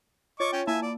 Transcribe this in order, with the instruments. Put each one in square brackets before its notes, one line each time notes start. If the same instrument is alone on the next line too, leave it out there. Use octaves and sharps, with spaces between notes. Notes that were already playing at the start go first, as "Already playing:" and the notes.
[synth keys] F4 C#5 A6 [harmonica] D#5 C#6 D6
[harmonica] C#4 G5
[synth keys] A#3 E4 A5 [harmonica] E5 G#5
[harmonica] D5